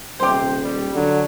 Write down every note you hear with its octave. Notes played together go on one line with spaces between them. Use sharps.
D#1 C3 G4 C5
G3
D3 F#3